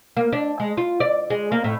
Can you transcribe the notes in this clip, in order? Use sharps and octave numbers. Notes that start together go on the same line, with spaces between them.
A#3
D4
G#3
F4
D5
G#3
A#3
A2